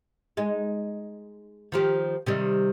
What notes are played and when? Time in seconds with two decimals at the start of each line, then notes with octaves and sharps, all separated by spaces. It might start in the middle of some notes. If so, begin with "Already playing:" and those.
0.37 G#3 D#4
1.72 D#3 F3 G4
2.26 C3 D#3 G3